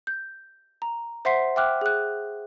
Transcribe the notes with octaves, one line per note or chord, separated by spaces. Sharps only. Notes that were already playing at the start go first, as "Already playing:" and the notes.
G6
A#5
C5 E5 F#5 C6 B6 C7
E5 G5 D6 F6 F#6
G#4 F#6